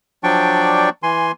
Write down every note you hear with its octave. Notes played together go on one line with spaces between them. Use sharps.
F3 F#3 D4 D5 G5 C#6
E3 G#5 C6